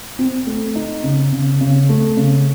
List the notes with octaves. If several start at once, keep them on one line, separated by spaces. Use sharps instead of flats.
C4
A3
D#4
C#3
C#3
C#3
A3
C#3